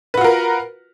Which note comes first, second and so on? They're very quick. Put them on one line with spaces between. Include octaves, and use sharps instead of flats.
B4 F#4 F4 A#4